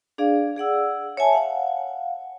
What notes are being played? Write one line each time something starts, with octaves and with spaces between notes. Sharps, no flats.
D4 G#4 D5 F5
G#4 D5 F#5 E6
C#5 E5 G#5 A5
F5 F#5